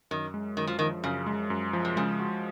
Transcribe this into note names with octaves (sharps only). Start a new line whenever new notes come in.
F#2 D#3
G#3
F#2 D#3
F3
D#3 F3
F#2 C#3
G#3
F#2
F3
C3
C#3 G#3
F#4